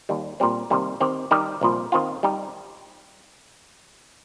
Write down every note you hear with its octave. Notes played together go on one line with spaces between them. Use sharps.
D#2 D#3 G3
A#2 G3 C4
C3 D#3 G3 A#3
D#3 C4 G4
D#3 G3 D#4 G4
C2 A#2 F3
D#3 C4 F4
G3 D#4 G4